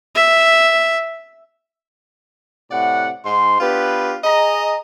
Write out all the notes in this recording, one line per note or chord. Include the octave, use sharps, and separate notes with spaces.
E5
A2 C3 D5 F#5
G#2 C6
B3 D4 F4 G4 B4
G#4 D#5 A#5